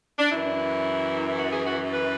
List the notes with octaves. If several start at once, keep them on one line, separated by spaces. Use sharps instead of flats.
D4
F#2 E3 E4
F#4
G#4
F#4
B4